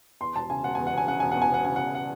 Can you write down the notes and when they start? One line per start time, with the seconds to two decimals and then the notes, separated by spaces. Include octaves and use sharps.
0.21 E2 C6
0.36 E1 A5
0.50 C#3 G#5
0.64 E1 F#5
0.75 E2 G#5
0.87 F#5
0.93 E1 G#5
1.08 C#3 F#5
1.20 E1 G#5
1.31 E2 F#5
1.42 G#5
1.51 E1 F#5
1.65 C#3 G#5
1.76 E1 F#5
1.95 F#5